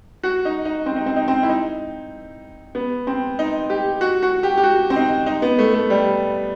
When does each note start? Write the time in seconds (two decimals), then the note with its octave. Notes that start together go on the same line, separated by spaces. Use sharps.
0.23 F#4
0.45 D#4
0.65 D#4
0.86 C4
0.96 D#4
1.06 C4
1.16 D#4
1.28 C4
1.43 E4
1.49 D#4
2.75 B3
3.07 C4
3.39 D#4
3.70 G4
4.01 F#4
4.23 F#4
4.43 G4
4.57 G4
4.64 F#4
4.90 C4
4.96 D#4
5.26 D#4
5.42 B3
5.59 A3
5.74 A3
5.90 G3